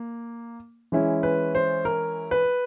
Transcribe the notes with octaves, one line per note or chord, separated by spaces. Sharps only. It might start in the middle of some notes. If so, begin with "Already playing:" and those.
Already playing: A#3
E3 G#3 C#4 E4
B4
C5
A#4
B4